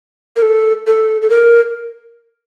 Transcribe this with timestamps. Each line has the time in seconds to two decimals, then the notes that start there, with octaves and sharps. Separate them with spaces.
0.36 A#4
0.42 A4
0.87 A4
1.22 A4
1.30 A#4